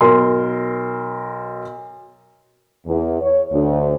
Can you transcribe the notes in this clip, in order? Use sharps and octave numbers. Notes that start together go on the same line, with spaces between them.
B1 A#4 C6
E2
C#5
D2